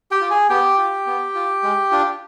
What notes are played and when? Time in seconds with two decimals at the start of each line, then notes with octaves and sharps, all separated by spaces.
0.11 G4 G5
0.21 F4
0.30 G#4 G#5
0.49 B3 G4 G5
0.78 F4
1.06 B3
1.35 F4
1.63 G#3
1.91 D4 F4